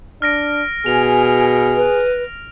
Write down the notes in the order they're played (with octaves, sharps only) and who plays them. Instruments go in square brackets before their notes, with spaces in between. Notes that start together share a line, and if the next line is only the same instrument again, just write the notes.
[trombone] D4 [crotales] F6 A#6 D7
[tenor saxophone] B2 [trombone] G#4 [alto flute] G#5 [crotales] F7
[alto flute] B4